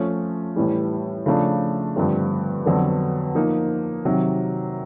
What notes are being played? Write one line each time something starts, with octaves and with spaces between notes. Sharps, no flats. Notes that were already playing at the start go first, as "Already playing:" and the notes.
Already playing: F3 A3 C#4
A2 E3 G3
C#3 F3 A3 D4
G2 D3 F3 A3 C4
F2 D3 F#3 B3
F3 A#3 D#4
C3 D#3 F#3